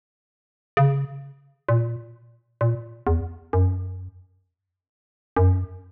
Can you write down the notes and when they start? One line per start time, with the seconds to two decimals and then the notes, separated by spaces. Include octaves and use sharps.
0.77 C#3
1.69 A#2
2.61 A#2
3.07 E2
3.53 F#2
5.37 F#2